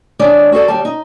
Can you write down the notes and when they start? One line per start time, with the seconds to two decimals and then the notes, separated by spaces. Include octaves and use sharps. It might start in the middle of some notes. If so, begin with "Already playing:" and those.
0.19 D#3 G#3 D4 C#5 D5
0.52 F#4 G#4 A4 D5
0.68 D#2 G3 A5
0.85 D#4